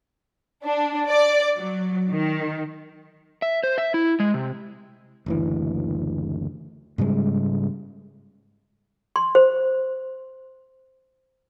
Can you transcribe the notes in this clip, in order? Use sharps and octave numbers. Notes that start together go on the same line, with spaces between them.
D4
D5
F#3
D#3
E5
C5
E5
E4
G#3
C3
F#1 D2 E3
G#2 C#3 G3 G#3
C6
C5